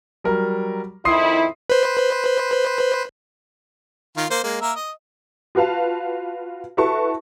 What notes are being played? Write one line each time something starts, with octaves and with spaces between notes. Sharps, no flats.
F#3 G3 A#4
F2 D#3 E4 C6 D#6 C7
B4 C5
D#3 F4
A#3 C5
G#3 A#3
A#3 A#4 E5
D#5
F4 F#4 B4 F5 A5
E4 F#4 A4 B4 A5 C#6